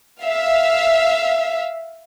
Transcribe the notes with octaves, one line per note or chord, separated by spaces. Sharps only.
E5 F5